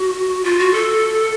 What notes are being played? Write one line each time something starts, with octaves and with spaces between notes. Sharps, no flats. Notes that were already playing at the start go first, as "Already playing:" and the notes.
Already playing: F#4
F4
F#4
A4